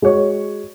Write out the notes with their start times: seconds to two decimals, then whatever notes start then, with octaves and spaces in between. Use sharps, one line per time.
0.02 G#3 F#4 C#5